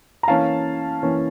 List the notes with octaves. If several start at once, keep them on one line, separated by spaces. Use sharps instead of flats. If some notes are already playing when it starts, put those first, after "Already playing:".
A#5
E3 A#3 C#4 F5 A5
E3 A#3 C#4